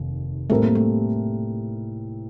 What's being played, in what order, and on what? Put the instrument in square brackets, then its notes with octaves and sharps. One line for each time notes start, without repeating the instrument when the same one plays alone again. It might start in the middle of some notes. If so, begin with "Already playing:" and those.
Already playing: [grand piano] F1 D#2
[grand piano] A2 G3 C4 G4 A#4 [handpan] A3
[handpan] A#3
A3